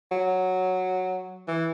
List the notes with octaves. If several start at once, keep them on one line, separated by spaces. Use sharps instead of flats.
F#3
E3